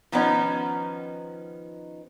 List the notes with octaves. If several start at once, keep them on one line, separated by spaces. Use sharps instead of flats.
D#3 F3 B3 C#4 D#4